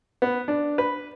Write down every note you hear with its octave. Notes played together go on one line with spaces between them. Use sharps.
B3
D4
B4